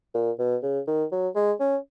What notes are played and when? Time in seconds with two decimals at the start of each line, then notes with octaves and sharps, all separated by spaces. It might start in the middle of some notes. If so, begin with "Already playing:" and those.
0.15 A#2
0.39 B2
0.63 C#3
0.87 D#3
1.12 F#3
1.35 G#3
1.60 C#4